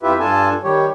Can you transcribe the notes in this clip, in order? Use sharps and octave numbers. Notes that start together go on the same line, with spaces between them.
F2 E4 F4 G4 B4 E5
G2 D4 F4 A4 G#5 A5
D#3 G3 G4 C#5